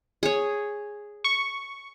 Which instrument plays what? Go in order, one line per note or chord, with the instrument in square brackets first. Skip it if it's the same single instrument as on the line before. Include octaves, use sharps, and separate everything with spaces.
[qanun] G#4 C#5
[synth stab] C#6